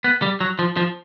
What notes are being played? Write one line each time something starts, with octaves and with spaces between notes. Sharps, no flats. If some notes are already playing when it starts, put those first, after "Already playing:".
B3
G3
F#3
F3
F3